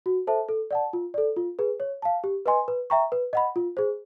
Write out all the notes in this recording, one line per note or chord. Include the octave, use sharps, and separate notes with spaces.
F#4
A4 C5 E5 A5
A4
D5 F#5 A5
F4
A4 D5
F4
G#4 B4
C#5
F5 A5
G4
B4 D#5 G#5 C6
B4
E5 G5 A#5 C#6
B4
D#5 F#5 B5
F4
G#4 C5